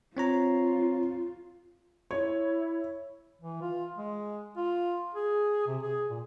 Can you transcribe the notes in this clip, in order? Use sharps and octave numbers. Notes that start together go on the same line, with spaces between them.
C4 F4 C#5 A#5
E4 C#5
E3
F4
G#3
F4
G#4
C3
G#4
A#2